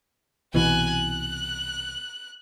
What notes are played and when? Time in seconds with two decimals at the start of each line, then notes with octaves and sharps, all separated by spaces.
0.54 C2 B2 E3 G#5 F#6
0.91 F#6